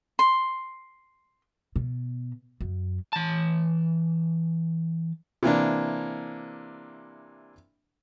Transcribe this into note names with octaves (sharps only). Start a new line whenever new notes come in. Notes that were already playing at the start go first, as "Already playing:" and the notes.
C6
B2
F#2
E3 A5
C3 E3 A#3 D4